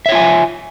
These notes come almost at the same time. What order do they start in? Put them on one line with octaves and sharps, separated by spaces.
E5 C#5 F4 G#5